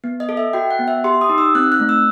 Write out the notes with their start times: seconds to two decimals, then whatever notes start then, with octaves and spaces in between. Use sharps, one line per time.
0.04 B3
0.20 D#5
0.29 A4
0.37 E5
0.53 F#4 G5
0.71 F#5
0.79 B3
0.88 E5
1.04 G4 C6
1.21 D#6
1.30 D#4
1.38 E6
1.55 C4 F#6
1.72 F#6
1.80 A3
1.89 E6